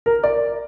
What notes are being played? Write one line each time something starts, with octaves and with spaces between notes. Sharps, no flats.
A#4
D5